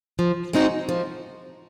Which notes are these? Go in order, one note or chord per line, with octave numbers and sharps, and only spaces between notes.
F3
G#3 C4 D#4 F#4
F3